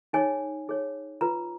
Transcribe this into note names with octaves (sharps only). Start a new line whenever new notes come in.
D#4 G#4 C#5 G#5
D#4 G#4 C#5
F4 B4 A#5